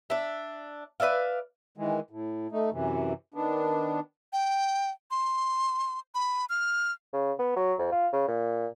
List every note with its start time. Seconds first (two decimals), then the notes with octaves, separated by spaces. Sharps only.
0.10 D4 E5
1.00 B4 D5 E5 F5
1.77 D#3 E3 G#3
2.10 A2
2.51 A3 D#4
2.72 F#2 C3 E3
3.34 D#3 B3 D4
4.33 G5
5.11 C6
6.15 B5
6.49 F6
7.13 C#3
7.39 B3
7.56 F#3
7.79 F2
7.92 F4
8.13 C#3
8.28 A#2